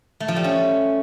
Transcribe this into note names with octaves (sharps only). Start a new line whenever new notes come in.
A3
F3
G3
C#4